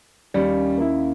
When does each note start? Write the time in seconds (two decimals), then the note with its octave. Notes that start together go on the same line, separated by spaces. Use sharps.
0.34 D#2 G3 C#4
0.77 A#3 E4